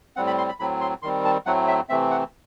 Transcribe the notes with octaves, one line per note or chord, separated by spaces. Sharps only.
A2 G3 C4 F#5
B5
C6
B5
A2 F#3 C4 B5
C6
D#3 G3 C4 C6
A5
A2 F#3 A3 C4 F#5
E5
C3 E3 A3 C4 E5
F#5